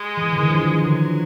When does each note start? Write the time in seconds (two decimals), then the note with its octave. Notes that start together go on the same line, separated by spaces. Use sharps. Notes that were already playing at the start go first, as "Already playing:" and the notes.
Already playing: G#3
0.17 E3
0.32 D3
0.39 D#3
0.50 F3
0.61 E3
0.82 D3 F#3